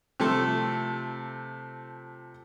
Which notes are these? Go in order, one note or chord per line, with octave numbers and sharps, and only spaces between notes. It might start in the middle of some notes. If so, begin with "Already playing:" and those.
C3 F3 A3 A4